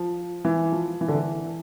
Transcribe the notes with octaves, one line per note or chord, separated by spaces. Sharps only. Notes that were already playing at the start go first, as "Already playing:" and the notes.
Already playing: F3
E3
F3
E3
D3
E3